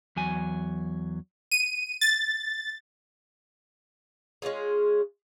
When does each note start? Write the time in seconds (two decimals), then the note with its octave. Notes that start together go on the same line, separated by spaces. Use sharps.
0.16 E2 F#3 G#5
1.52 D#7
2.01 A6
4.42 G#3 C#4 F4 G#4